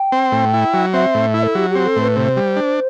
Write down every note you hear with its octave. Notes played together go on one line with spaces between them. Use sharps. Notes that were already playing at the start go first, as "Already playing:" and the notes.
Already playing: G5
C4
A2
E4
F#3
C4 E5
A2
E4
A4
F#3 G4
G4
C4
A4
A2 B4
C3 C5
G3
D4